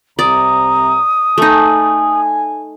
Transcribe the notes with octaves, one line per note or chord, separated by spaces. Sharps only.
C2 C3 D5 A#5 D#6
A3 D#4 G#5